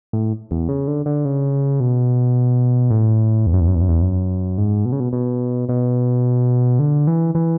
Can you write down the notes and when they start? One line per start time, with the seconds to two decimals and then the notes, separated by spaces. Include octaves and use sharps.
0.13 A2
0.51 E2
0.69 C#3
0.88 D3
1.06 D3
1.25 C#3
1.80 B2
2.91 A2
3.47 E2
3.54 F#2
3.61 E2
3.67 F#2
3.75 E2
3.82 F#2
3.88 E2
4.02 F#2
4.58 G#2
4.85 B2
4.92 C#3
5.00 B2
5.13 B2
5.69 B2
6.79 D3
7.07 E3
7.35 E3